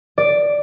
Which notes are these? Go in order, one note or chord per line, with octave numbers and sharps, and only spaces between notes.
D5